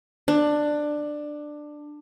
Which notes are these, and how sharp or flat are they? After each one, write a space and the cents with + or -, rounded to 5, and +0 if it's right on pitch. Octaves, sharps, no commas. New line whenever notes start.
D4 +15